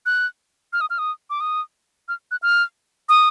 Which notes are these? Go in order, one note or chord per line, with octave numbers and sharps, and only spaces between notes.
F#6
F6
D#6
F6
D#6
D6
D#6
F6
F#6
F6
D#6